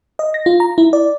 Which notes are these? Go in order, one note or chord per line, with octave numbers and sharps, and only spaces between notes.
D#5
A#6
F4
A#5
E4
D5